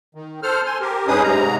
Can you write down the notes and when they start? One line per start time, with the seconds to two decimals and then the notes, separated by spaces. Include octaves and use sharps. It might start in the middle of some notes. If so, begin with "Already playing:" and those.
0.15 D#3
0.43 A4 C5 F6
0.66 G#5 C6
0.81 G4 A#4
1.07 G2 C#4 D#4 G#4 B4 D#6
1.23 G#2 C3 A#5